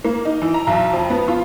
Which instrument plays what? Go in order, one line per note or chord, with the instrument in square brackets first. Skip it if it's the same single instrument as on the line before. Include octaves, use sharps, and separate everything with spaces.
[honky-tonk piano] A#3
D#4
E3
A#5
B1
F2
B3
F4